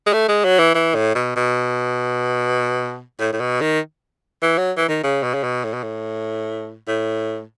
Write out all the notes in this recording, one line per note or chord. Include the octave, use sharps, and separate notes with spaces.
G#3
A3
G#3
F#3
E3
E3
A2
B2
B2
A2
A2
B2
D#3
E3
F#3
E3
D#3
C#3
B2
C#3
B2
A2
B2
A2
A2